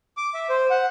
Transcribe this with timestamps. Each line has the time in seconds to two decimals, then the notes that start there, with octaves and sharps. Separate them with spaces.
0.17 D6
0.34 E5
0.49 C5
0.70 F#5